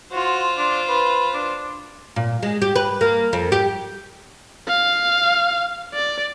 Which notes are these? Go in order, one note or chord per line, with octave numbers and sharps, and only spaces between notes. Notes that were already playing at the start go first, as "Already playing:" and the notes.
F4 F#4 C5
D4
B4
D4
A#2
G#3
G4
B4
A#3
F2
G4
F5
D5